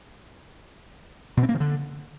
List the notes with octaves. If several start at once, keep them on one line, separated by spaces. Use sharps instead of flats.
B2
C4
A#3
D#3
D3